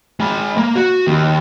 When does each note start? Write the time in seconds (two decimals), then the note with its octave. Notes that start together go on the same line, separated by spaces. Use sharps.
0.20 G#3 B5
0.58 A#3
0.76 F#4
1.07 D#2